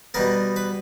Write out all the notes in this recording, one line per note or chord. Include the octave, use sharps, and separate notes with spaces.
B2 G3 B3 A#4
B4